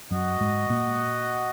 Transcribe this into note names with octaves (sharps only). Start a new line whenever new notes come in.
F#2 F#3 F#4 D#5 F#5
G#2 G#3
A#2 A#3